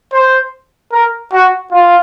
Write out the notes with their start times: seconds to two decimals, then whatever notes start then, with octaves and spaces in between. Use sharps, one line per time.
0.13 C5
0.92 A#4
1.33 F#4
1.72 F4